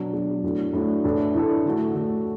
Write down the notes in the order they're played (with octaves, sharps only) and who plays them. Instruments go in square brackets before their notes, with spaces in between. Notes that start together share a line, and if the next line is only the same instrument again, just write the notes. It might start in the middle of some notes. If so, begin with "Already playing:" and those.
Already playing: [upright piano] B2 F#3 D4
B2 F#3 D4
A2 A3 D4 F#4
A2 A3 D4 F#4
A2 E3 D4 A4
A2 E3 D4 A4
D3 A3 F#4
D3 A3 F#4